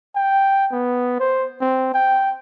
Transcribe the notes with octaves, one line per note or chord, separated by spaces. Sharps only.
G5
B3
C5
C4
G5